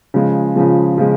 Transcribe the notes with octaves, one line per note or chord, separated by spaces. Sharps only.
C#3 F3 G#3
C#3 F3 G#3
C#3 F3 G#3